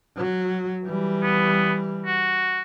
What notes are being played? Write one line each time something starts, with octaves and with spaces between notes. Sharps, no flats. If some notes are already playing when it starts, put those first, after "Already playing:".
F#3
E3 G3
B3
F#4